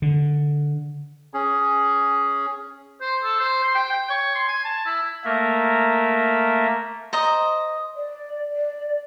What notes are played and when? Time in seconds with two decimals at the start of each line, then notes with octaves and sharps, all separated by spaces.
0.02 D3
1.34 C#4 G#4
3.01 C5
3.23 A4
3.40 C5
3.63 C6
3.75 G5
3.92 G5
4.10 C#5
4.35 C6
4.48 G#5
4.64 A5
4.86 E4
5.25 A3 A#3 A#4 E5
7.13 C5 D#5 A#5
7.96 D5
8.56 D5